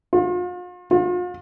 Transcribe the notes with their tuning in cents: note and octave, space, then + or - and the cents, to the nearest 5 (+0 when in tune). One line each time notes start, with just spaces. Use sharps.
F4 +40
F4 +40